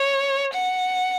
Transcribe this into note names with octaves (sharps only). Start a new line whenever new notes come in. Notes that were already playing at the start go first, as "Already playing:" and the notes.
Already playing: C#5
F#5